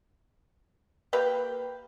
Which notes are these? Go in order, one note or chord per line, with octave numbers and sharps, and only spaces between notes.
A#3 G4 B4 G5